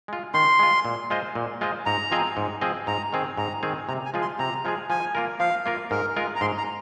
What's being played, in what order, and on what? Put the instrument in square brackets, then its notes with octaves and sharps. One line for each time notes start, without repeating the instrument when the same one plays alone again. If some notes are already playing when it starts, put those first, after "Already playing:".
[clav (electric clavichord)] G#3 F4
[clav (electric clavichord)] D#3 [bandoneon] C6
[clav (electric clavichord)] G#3 F4
A#2
G#3 F4 C5 D#5
A#2
G#3 F4 C5 D#5
[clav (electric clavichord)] G#2 [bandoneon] A#5
[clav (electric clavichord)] F3 C4 G#4 D#5
G#2
F3 C4 G#4 D#5
[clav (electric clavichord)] G#2 [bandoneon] A#5
[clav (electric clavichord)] D#3 C4 G#4
[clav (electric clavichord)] G#2 [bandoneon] A#5
[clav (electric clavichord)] D#3 C4 G#4
[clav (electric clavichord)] C3 [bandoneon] A#5
[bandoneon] G#5
[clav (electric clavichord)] F3 G#3 F4 G#4
[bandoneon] C6
[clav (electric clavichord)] C3 [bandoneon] A#5
[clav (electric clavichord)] F3 G#3 F4 G#4
[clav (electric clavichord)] F3 [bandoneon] G#5
[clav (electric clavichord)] A#3 F4 A#4
[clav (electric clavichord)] F3 [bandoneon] F5
[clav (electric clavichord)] A#3 F4 A#4
[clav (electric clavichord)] G#2 [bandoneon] A#4
[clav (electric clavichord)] G#3 F4 A#4
[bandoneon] A#5
[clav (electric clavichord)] G#2 [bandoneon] C6
[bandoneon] A#5